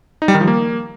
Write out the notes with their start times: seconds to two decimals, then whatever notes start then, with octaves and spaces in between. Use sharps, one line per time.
0.22 D#4
0.28 G3
0.35 D#3
0.41 F3
0.48 A#3